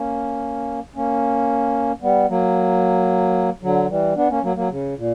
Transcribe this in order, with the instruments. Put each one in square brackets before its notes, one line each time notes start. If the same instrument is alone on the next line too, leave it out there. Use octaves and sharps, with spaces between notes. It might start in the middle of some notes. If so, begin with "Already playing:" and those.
Already playing: [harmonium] A#3 C#4
A#3 C#4
G3 B3
F#3 A#3
D3 F#3
E3 G3
B3 D4
A#3 C#4
F#3 A#3
F#3 A#3
C#3
A#2